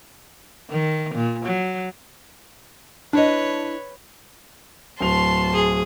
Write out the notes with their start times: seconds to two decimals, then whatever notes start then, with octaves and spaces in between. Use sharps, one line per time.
0.70 D#3
1.14 A#2
1.45 F#3
3.13 D4 E4 B4 C#5 D#5
5.01 D1 A5 C6 F7
5.54 G#4